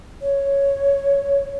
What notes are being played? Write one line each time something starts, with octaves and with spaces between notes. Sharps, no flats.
C#5